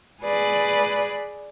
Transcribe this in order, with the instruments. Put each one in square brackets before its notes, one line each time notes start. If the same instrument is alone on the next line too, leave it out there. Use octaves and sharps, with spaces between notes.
[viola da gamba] G#4 B4 D5